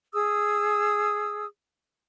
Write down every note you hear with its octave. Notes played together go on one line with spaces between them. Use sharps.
G#4 D#6 E6